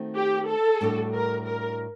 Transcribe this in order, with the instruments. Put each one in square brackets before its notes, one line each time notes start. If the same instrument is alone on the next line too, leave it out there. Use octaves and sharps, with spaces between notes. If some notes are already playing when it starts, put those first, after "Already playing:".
Already playing: [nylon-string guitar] D#3 A3 C4 F#4
[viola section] G4
A4
[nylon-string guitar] A2 G3 D4 F#4
[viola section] A#4
A#4